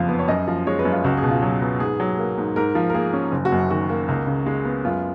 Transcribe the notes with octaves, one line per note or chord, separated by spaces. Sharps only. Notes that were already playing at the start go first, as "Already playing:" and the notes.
Already playing: F#1 F2 F3 F5
B3
C#5
F#2 D#5
F3
G#3 C#5
B4
F#2
F4
C#2 F#4
G#4
B2
F4
F#3
B3
G#2 G#4
F#3
A#3
G#2
G#2 A#4
F3
A#4
A#3 G#4
C#4
F#1
F#4
F#2
D#3 F#4
A#3
C#2
C#3
G#3
B3
F#2 F4